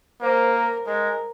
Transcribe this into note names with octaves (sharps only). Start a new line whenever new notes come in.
A#3 C5
A#4
G#3 A#4